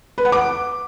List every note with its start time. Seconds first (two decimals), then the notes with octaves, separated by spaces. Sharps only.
0.18 B4
0.25 F#5
0.32 D6